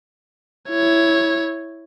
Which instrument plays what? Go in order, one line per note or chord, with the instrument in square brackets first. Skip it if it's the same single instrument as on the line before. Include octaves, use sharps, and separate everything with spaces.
[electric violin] E4 C#5